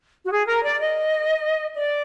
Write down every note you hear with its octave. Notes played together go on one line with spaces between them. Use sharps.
F#4
G#4
A#4
D5
D#5
D5